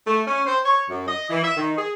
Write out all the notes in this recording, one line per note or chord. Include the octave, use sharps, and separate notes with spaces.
A3
C#4
C5
C#5
F#2
D#5
E3
E5
D#3
G#4